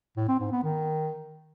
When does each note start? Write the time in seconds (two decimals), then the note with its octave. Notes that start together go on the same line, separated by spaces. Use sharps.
0.16 A2
0.28 C4
0.40 G#2
0.52 B3
0.63 D#3